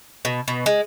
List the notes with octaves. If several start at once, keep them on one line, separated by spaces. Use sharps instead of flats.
B2
B2
G#3